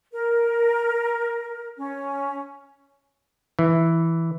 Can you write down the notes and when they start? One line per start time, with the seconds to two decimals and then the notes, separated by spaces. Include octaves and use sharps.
0.12 A#4
1.78 C#4
3.59 E3